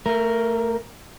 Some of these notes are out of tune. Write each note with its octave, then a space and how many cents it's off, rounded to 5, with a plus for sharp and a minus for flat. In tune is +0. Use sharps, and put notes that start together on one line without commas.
A3 +25 A#4 +0